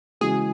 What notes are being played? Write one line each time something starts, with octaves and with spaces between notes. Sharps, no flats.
C#3 E3 G#3 C#4 F#4 G#4